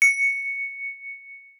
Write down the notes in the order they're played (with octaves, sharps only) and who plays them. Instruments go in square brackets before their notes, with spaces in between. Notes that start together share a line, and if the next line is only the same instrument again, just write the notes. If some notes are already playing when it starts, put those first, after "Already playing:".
[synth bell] C#7